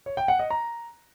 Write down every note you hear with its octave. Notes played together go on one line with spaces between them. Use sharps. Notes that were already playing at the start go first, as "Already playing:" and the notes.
C#5
G5
F#5
D#5
A#5